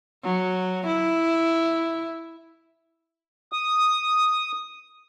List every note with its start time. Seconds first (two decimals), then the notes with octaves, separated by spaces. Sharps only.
0.24 F#3
0.87 E4
3.52 D#6